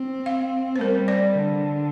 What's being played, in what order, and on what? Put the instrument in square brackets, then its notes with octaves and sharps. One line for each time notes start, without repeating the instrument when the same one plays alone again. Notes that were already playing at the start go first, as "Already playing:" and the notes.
Already playing: [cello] C4
[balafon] F5
C5
[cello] G3 [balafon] A#4
[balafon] D5
[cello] D3